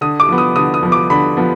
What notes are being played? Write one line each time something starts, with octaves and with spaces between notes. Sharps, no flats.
D3 D#6
D6
F3 B3
D#6
D3 D#6
D#6
F3 B3
D6
D3 B5
F3 B3